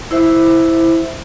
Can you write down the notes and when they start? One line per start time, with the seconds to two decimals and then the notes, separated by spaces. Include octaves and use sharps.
0.11 E4 C5 E5